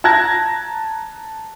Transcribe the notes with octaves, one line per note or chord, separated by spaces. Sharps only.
A5 A#5 F#6 G#6 A#6